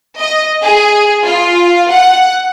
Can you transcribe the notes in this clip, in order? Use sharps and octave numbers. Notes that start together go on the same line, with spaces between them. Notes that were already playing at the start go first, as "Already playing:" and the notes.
D#5
G#4
F4
F#5